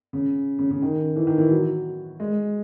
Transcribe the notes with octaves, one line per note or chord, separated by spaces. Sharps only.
C#3
C#3
C#3
D#3
E3
D#3
E3
F#3
G#3